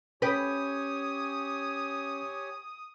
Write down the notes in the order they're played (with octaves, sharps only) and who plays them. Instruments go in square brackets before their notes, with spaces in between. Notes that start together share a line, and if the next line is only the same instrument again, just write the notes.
[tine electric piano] C#4 G5 [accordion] G4 C#5 G#5 [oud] B4 [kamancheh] D#6